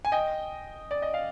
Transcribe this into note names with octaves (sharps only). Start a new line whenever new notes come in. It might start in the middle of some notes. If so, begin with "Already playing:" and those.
G#5
D#5 G5
D5
D#5
F5